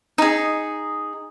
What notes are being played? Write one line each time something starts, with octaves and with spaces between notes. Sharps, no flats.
D#4 G#4